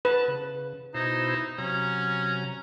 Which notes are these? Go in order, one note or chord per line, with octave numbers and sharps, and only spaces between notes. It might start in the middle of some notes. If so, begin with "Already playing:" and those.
B4 A5
C#3
B2 D#4 E4 C5
C3 F#3 C#4 A#5